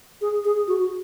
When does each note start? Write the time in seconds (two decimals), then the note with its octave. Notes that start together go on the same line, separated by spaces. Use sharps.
0.21 G#4
0.45 G#4
0.68 F#4